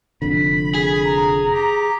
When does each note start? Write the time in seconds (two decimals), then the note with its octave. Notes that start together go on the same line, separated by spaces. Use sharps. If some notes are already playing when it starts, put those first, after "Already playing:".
0.22 F1 F2 D3 B5
0.75 G#4
1.05 A#5
1.53 G4